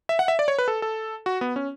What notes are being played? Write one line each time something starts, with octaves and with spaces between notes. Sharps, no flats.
E5
F#5
E5
D5
C#5
B4
A4
A4
F#4
B3
C#4